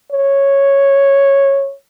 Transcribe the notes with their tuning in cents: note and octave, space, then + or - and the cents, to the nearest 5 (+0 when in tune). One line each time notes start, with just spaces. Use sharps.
C#5 -5